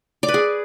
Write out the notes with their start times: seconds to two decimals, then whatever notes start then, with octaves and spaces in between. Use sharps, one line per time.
0.23 D5
0.28 B4
0.34 G#4